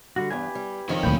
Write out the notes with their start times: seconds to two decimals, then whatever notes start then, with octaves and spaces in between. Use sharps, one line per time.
0.16 D3 G3 F#4
0.31 E2 G2 G4 B4 G#5
0.55 G3
0.89 F2 D#3 C4 C#4
1.03 D2 A#2 G5 B5